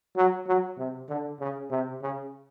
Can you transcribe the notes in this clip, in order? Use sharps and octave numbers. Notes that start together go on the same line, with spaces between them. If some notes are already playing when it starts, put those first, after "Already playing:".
F#3
F#3
C3
D3
C#3
C3
C#3